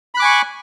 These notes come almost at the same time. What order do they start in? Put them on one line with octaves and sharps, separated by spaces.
B5 F#6 D6 G#5 C#6